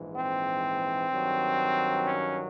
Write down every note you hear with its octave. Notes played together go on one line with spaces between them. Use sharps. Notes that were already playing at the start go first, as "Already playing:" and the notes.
Already playing: A#1 G#2 E3
C4
G2 D#3 F#3
C#4